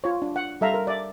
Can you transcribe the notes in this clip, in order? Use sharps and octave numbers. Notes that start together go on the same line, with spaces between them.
F4 C#5
D4
F#5
G3 A4 E5 F5 A#5
A#4
D5 E5